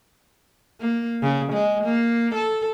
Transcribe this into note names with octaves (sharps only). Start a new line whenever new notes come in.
A#3
C#3
G#3
A#3
A4